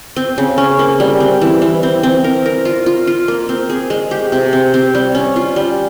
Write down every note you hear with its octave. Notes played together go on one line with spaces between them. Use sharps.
C4
C#3
C#4
A#3
G3
C4
E3
E3
C4
C4
A#4
A#4
F4
F4
F4
A#3
C4
G#4
G#3
G4
C3
C4
C4
G3
C#4
F4
G3